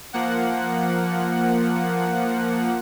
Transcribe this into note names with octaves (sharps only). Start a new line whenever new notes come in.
F3 A#3 F#5